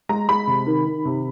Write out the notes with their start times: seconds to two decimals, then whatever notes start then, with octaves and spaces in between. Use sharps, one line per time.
0.09 G#3 A#5
0.29 G#3 B5
0.47 C3
0.66 D#3
0.86 D#3
1.05 C3